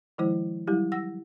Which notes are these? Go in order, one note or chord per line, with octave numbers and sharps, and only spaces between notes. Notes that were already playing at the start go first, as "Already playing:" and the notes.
D#3 F3 G#3 E4 C5
F#3 G3 E4 G4
F#5 E6 A#6